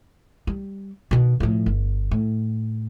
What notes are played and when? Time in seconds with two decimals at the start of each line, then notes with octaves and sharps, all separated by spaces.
0.47 G3
1.11 B2 D#3
1.40 A2 F3
1.66 G1
2.11 A2